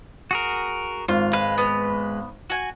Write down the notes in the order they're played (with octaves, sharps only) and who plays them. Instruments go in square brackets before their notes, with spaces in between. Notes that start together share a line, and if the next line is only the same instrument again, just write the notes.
[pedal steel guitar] F#4 G#4 A#4
[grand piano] G#1 [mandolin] F4
[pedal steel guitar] G#3 B4 [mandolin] F5
[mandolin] B3
F#4 G#5